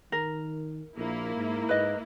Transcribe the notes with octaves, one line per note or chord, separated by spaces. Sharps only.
D#3 A#4
A#1 A#3 E4
G#2
G#2 B4 D#5